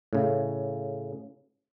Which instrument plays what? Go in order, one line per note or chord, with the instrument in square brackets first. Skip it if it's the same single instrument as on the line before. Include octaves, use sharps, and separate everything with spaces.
[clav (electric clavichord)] A2 C#3